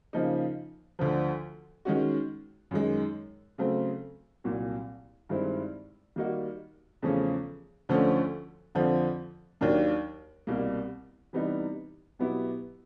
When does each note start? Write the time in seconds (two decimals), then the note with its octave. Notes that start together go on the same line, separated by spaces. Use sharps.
0.13 C#3 F3 A#3 D#4
0.99 D2 D3 F3
1.85 D#3 G#3 C#4 F#4
2.71 F#2 D#3 G#3
3.58 C#3 F#3 A3 C4
4.44 C2 A#2 F#3
5.29 G2 D#3 G#3 C4 E4
6.16 D#3 G3 A#3 D#4 F#4
7.02 E2 C#3 F3 A3 C#4
7.89 D2 D3 F3 A3 C#4
8.75 F2 D3 F3
9.61 D#2 D#3 F#3 A#3 D4
10.47 C2 B2 G3 A#3
11.33 C3 E3 G3 B3 D#4
12.19 B2 F#3 B3 E4 G4